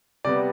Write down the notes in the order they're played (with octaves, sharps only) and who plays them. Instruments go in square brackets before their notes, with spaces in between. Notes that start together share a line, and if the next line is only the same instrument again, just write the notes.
[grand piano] C3 G3 B3 D5